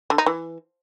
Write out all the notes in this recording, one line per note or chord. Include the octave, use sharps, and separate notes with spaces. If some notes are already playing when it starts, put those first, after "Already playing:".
D3
D#4
E3